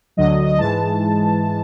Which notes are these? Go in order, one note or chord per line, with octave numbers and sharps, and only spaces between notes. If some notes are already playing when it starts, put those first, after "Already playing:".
D2 D3 F#3 D#5
D#5
G#2 E3 G#3 A5